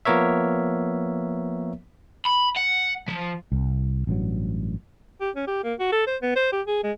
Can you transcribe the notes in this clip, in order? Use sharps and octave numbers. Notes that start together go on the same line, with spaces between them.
F3 A#3 B3 A#4 C#5 E5
B5
F#5
F3
C2
A1 G2 F#3
G4
C#4
G4
A#3
F#4
A4
C5
B3
C5
G4
G#4
G#3